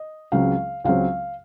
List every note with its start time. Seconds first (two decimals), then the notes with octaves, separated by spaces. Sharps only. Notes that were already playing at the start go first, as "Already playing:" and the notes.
Already playing: D#5
0.32 C#2 C#3 F#3 C4 F5
0.84 C#2 C#3 F#3 C4 F5